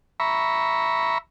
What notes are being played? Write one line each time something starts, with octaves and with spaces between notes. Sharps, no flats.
E5 A#5 B5 C#6